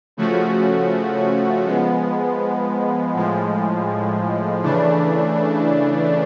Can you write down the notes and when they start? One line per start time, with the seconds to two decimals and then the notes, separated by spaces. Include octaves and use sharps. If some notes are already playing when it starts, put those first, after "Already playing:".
0.17 C#3 F3 A3 C#4 F#4
1.65 F3 G#3 B3
3.14 A2 F3 G#3
4.63 C#3 E3 A3 D4